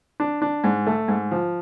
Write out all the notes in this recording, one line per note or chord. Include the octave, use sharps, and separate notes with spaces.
D4
D4
G#2
A3
G#2
F3